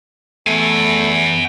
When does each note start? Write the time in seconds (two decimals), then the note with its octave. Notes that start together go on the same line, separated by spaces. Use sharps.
0.47 E2 A3 F#5 G#5